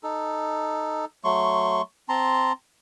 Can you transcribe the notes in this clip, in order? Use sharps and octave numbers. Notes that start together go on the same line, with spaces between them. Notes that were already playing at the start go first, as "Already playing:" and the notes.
D#4 A4
F#3 A3 C6 C#6
C4 A5 A#5 C6